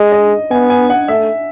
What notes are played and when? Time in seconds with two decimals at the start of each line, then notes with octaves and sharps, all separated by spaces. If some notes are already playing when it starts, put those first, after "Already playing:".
Already playing: G#3 D#5
0.12 D#5
0.51 B3 G#5
0.70 G#5
0.90 F#5
1.08 A3 E5